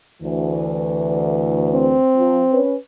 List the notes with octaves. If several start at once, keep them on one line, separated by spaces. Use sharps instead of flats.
D2 E3
C4
F3
C#4 B4